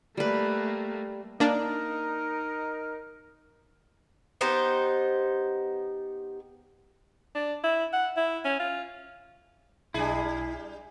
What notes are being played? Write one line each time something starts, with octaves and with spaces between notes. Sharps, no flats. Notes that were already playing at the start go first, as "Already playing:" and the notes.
G3 A3 A#3 B4
A#3 D4 D#4 A#4
B3 D#4 G4 C5
D4
E4
F#5
E4
C#4
F4
B1 G3 D4 E4 G#4